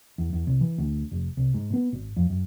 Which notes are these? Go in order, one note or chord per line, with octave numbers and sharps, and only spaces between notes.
E2
E2
C2
E3
D2
F1
C2
G#2
B3
G#1
F2
F#2